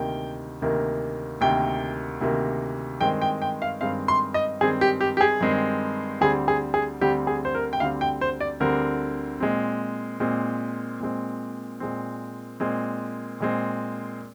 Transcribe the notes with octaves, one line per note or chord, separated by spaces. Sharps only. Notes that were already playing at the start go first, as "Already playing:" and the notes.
Already playing: D2 C3 D#3 A#3 G5
D2 C3 D#3 A#3
D2 C3 D#3 A#3 G5
D2 C3 D#3 A#3
G2 D#3 G#3 C4 G5
G5
G5
F5
G2 D#3 G#3 C4 F5
C6
D#5
G2 D#3 G#3 C4 G#4
G4
G4
G4
G#4
G2 D#3 G#3 C4
D2 D3 G3 C4 G#4
G#4
G#4
D2 D3 G3 C4 G4
G#4
C5
A#4
G5
D2 D3 G3 C4 F5
G5
C5
D5
D2 D3 G3 C4 A#4
A#2 G#3 C4
A#2 G#3 C4
A#2 G#3 C4
A#2 G#3 C4
A#2 G#3 C4
A#2 G#3 C4